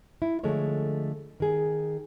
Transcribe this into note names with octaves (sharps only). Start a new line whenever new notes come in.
E4
D3 F3 G#3 A3 C#5
D#3 G#4